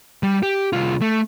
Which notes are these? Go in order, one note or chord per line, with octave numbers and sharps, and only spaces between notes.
G3
G4
C2 F4
A3